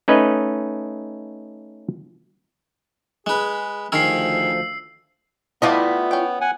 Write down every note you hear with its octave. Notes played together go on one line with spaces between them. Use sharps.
A3 C#4 D#4 B4 D#5
G#3 G#4 B4
D2 D#3 F3 G#4 A#4 E6 C7
G3 A3 B3 E4 F4 D5 D#5
C#4 G5
F#5 G#5